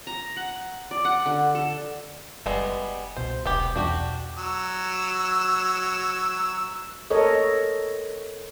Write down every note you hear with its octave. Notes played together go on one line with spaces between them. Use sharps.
A#5
F#5
D5
F#5
D3
A4
F#1 G3 G#3 B3
C2 B2 C5
E1 B3 G4
E2 D4 F#4 G4
F#3 E6
A4 A#4 C#5 D#5